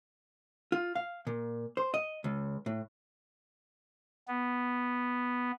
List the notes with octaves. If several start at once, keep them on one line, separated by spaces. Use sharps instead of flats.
F4
F5
A#2
C5
D#5
C#2
A2
B3